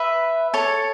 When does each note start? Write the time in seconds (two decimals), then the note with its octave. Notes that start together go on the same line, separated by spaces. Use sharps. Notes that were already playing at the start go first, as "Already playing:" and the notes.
Already playing: B4 E5
0.54 A4 C#5